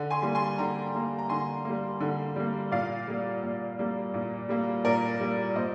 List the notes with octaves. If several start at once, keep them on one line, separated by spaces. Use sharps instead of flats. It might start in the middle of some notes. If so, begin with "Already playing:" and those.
Already playing: D3
G#5 C6
G3 A#3
G#5 C6
D3 G5 A#5
G3 A#3
A#5
D3 G#5 C6
G3 A#3
D3
G3 A#3
A#2 D5 F5
G3 A#3
A#2
G3 A#3
A#2
G3 A#3
A#2 A#4 D5
G3 A#3
A#2 C5 D#5